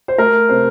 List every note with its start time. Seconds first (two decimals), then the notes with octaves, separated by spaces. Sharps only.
0.08 C5
0.18 A3 A#4
0.49 C3 C5